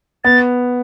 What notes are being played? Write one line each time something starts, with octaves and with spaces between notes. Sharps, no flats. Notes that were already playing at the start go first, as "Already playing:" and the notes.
B3 A6